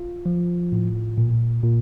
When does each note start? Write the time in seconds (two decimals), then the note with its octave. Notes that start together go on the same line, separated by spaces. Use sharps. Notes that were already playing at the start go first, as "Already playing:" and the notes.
Already playing: F4
0.26 F3
0.72 A2
1.18 A#2
1.63 A#2